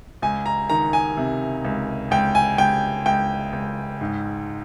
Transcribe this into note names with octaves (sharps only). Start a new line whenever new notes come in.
C#2 G#5
A#5
D#3 A#5
G#5
C3
C#2
C#2 G5
G#5
C#2 G5
C#2 G5
C#2
G#2